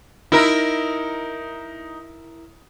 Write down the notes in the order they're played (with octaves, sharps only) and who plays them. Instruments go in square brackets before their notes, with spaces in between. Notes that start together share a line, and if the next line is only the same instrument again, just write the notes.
[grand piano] D#4 [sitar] E4 A#4